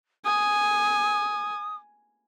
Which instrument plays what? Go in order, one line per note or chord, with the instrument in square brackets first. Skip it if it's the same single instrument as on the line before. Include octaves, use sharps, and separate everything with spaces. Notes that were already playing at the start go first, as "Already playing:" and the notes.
[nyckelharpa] G#5 [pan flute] D#6